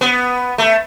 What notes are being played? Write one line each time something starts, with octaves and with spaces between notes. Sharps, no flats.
B3
A3